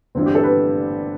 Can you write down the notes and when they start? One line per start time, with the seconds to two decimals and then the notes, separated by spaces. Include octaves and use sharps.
0.15 G1 G2 E3 C4
0.26 G4
0.35 A4
0.43 B4